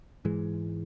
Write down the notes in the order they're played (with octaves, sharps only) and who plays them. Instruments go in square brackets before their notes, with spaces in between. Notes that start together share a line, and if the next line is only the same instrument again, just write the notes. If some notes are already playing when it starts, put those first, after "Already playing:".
[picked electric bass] G#2 E3 G#3